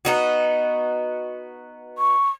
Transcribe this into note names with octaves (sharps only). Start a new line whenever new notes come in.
B3 D#4 F#4
C#6